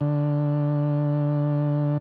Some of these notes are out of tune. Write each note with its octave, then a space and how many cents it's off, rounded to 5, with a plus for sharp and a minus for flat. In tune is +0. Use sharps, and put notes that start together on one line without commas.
D3 +0